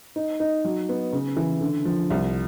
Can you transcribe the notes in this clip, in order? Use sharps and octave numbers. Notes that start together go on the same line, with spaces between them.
D#4
D#4
F#3
B3
C#3
E3
D3
F3
C2